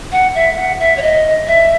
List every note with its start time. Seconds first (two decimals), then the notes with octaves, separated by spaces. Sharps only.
0.12 F#5
0.35 E5
0.56 F#5
0.80 E5
0.97 C#5
1.02 D#5
1.47 E5